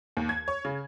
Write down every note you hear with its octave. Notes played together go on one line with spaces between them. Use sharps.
D#2
G#6
C#5
C#3